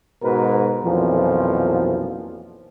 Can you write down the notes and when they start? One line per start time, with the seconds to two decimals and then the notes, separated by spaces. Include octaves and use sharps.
0.22 G#2 B2 F#4 A#4 B4
0.83 B1 F2 A#2 E3 F3